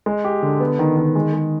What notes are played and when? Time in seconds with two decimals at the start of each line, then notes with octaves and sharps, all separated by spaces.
0.06 G#3
0.24 G4
0.42 D3
0.60 B3
0.79 D#3
0.97 D#3
1.15 G#3
1.34 G#3